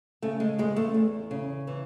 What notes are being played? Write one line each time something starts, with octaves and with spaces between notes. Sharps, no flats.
C#3 A3
G#3
E2 G#3
A3
E2
C#3
E3